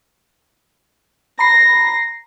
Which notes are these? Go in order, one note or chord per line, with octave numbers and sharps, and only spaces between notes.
A#5 B5 A#6 C7